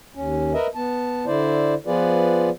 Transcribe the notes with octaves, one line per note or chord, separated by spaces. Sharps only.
D#2 C#4
A#4 B4 D#5 E5
B3 A5
D3 E4 C5 D5
F3 B3 F4 G#4 B4 D5